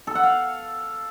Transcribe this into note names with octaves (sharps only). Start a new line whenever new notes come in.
A4
F#5
F5